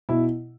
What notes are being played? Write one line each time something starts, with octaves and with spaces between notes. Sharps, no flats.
B2 E4